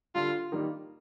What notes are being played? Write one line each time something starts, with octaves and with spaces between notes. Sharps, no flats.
D3 G3 D4 F4
D#3 G3 A#3 D#4